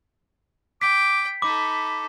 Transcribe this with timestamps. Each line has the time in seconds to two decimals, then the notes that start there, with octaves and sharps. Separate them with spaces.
0.82 G5 D6 B6
1.42 D#4 A4 B5 D6